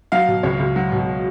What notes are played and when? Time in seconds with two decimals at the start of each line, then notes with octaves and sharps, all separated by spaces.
0.12 F#3 F5
0.28 B2
0.43 C#2 C#5
0.59 C#2
0.76 F#3
0.92 B2